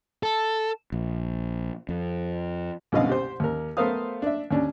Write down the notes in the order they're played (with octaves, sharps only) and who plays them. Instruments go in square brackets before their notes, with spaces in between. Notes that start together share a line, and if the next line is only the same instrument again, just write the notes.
[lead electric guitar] A4
[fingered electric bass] A#1
F2
[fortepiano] C2 F#2 B2 D3 D#5 F5
G4 C5
D#2 A#4
A3 B3 A#4 C5 F5 D#6
D4 E5
D#2 C#4 D4